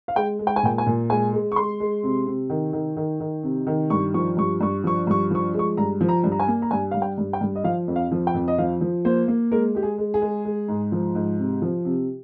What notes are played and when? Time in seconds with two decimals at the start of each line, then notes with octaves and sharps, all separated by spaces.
0.08 F5
0.16 G#3 G5
0.39 G#3
0.47 G5
0.56 G#5
0.63 A#2 G5
0.78 G#5
0.86 A#2
1.10 G#3 G#5
1.33 G#3
1.52 C#6
1.56 G#3 C6
1.80 G#3
2.03 C3
2.27 C3
2.50 D#3
2.73 D#3
2.97 D#3
3.20 D#3
3.43 C3
3.67 D#3
3.90 G2 C#6
4.14 F3 C#6
4.37 G2 C#6
4.61 G2 C#6
4.84 F3 C#6
5.07 G2 C#6
5.31 F3 C#6
5.54 G#3
5.59 C#6
5.77 G2 A#5
6.01 F3
6.09 A#5
6.24 G2
6.32 A#5
6.40 G#5
6.48 A#3
6.62 A#5
6.71 G2 G#5
6.91 G2 F5
7.02 G5
7.18 G2
7.33 G5
7.41 G2
7.55 D#5
7.64 F3 F5
7.88 F2
7.96 F5
8.12 F3
8.27 G5
8.34 F2
8.48 D#5
8.58 F3 F5
8.81 F3
9.05 A#3 C5
9.28 A#3
9.51 G#3 A#4
9.75 G#3 G4
9.83 G#4
9.98 G#3
10.14 G#4
10.22 G#3
10.45 G#3
10.68 G#2
10.92 F3
11.15 G#2
11.39 C3
11.62 F3
11.85 C3